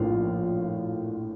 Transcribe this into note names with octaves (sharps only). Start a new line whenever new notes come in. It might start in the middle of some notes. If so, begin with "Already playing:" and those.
Already playing: A#1 A2 F4